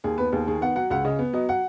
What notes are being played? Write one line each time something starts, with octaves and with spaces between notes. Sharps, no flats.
D#2 G#4
B3 B4
D#2 G#4
D#3 G#4
B3 F#5
F#3 F#5
C#2 F#5
C#3 D#5
B3
F#3 D#5
F#5